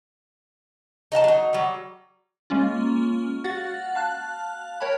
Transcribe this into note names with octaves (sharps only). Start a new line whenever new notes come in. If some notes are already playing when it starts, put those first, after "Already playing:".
D#4 D#5 F5 A5
F#3 D#4
F#3 G3
G#3 A#3 C#4 F4
F#4 F5 F#5 A6
F5 A5 F#6
A#4 C#5 G5 A5 B5